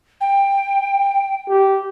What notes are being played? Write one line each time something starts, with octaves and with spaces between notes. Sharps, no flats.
G5
G4